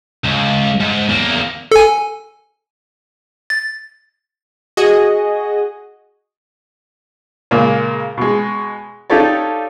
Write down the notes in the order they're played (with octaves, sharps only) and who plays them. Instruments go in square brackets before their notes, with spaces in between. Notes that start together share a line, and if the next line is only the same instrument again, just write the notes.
[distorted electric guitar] C#2
G#2
E2 A#3
[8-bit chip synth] A4 G#5
A6
[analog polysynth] F#4 G#4 D#5
[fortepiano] A#2 C#3 G#3 A#3
B2 G#3
D#4 F4 G4 A4 C#5 D5